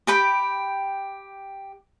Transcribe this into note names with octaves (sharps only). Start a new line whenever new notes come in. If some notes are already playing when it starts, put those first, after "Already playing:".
G4 G5 B5